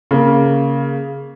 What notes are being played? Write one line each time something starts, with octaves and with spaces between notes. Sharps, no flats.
C#3 A#3